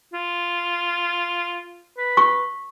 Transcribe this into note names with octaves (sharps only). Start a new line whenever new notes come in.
F4
B4
C#6